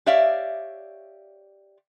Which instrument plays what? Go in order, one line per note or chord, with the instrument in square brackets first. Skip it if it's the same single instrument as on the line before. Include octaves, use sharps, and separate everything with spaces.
[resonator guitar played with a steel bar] G4 C#5 D5 E5 F5